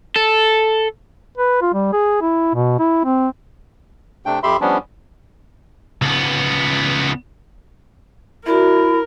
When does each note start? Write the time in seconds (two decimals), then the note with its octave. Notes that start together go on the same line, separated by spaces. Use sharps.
0.16 A4
1.38 B4
1.62 F4
1.74 G3
1.93 G#4
2.21 E4
2.54 B2
2.79 E4
3.04 C4
4.26 C3 A3 D4 G5
4.43 F2 G4 E5 B5 C6
4.61 F3 G3 B3 C#4 D4
6.02 C#2 B3
8.46 E4 F#4 A#4 D5 E5